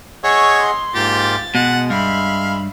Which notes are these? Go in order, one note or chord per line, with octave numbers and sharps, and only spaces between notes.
G#4 C#5 D#5 F#5 C#6 E6
C6
G#2 A#3 F4 G4 A6
B2 G#3 F#5
G2 E5 F5 B5